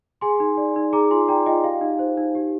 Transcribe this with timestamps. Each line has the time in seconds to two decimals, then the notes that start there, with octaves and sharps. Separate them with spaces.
0.21 G#4 G#5 C6
0.40 D#4
0.57 D5
0.76 D#4
0.93 G#4 A#5 D6
1.11 F4 G#5 C6
1.28 D5 G5 A#5
1.46 F4 D#5 G5
1.64 G4 F5
1.81 D#4
1.99 C5
2.17 D#4
2.35 G4